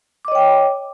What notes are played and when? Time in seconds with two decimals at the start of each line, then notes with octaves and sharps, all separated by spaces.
0.25 D6
0.28 D#5
0.32 C#5
0.35 G5